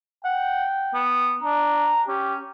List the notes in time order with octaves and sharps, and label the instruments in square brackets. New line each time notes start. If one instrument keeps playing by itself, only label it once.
[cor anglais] F#5 [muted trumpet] G5
[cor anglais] B3
[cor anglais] D4 [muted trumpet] A#5
[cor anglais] C#4 [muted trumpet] G4